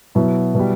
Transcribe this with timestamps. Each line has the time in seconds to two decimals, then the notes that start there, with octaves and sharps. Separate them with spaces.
0.15 B2 F#3 E4
0.55 B2 G3